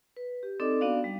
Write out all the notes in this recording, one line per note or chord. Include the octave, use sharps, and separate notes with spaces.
B4
G4
C4 D#4 A4 D5 D#5 D6
B3 D4 F#4 D5 F5
G3